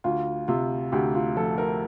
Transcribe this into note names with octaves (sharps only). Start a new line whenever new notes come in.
D2 F4
C3 F4
D2 G4
F4
F3 A4
A#4